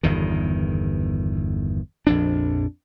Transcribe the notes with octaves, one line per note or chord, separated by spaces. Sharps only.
G1 E2 D#3
A#1 F2 D4